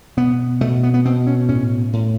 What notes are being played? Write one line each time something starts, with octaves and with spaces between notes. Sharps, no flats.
B2 B3
B2 A3
B3
B3
B2 C4
C#4
A2 C#4
A2